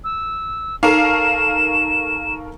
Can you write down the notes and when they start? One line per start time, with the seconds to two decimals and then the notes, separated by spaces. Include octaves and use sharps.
0.04 E6
0.83 D#4 A4 A#4 F5 A#5 C#6 E7